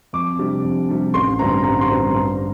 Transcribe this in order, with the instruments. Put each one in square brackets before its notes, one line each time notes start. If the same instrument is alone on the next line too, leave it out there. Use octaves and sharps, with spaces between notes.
[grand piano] F2 D6
C3 G3 D4
F2
C3 G3 D4
A1 C6
G2 D3 G3 C4 A#5
A1 A#5
C6
G2 D3 G3 C4
G2